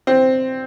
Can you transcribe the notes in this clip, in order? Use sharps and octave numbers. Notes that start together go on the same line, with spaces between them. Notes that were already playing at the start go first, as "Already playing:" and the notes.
C4